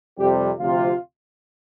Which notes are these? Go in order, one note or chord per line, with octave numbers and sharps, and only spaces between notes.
F2 C3 G3 G4
D2 C3 F3 F4